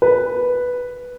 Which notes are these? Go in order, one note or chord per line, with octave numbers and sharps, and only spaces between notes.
B4